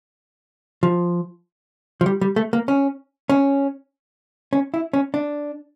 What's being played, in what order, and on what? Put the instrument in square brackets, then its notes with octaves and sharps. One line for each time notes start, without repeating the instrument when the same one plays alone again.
[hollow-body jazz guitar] F3
F3
G3
G3
A3
A#3
C#4
C#4
C#4
E4
C#4
D4